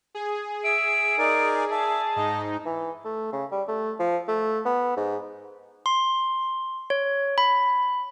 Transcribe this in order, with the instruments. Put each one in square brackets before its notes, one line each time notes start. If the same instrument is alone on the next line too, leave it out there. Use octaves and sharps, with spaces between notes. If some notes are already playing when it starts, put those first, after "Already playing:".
[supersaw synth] G#4
[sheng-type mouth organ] E5 E6 [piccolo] D7
[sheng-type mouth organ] D#4 A#4 D5
[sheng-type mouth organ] D5 E5 [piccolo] A5
[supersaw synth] G#2 D#4 [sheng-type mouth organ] D#5
[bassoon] E3
A3
C#3
G3
A3
F3
A3
B3
G#2
[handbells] C6
C#5
B5